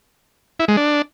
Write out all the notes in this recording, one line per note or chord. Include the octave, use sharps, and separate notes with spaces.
E4
G#3
D4